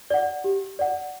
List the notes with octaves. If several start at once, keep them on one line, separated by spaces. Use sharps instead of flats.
D5 F#5
G4
D5 F#5